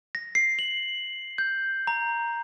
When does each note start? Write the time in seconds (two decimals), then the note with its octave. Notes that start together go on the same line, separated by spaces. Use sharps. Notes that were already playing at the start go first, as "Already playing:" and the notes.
0.15 A#6
0.35 C7
0.59 F#7
1.38 G6
1.87 A#5